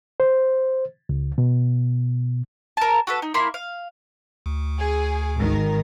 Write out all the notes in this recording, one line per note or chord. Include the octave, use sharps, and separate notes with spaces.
C5
C#2
B2
A#4 A5
F#4 A4 B4
D#4
A#3 E4 C6
F5
D2
G#4
G#1 D#3 A#4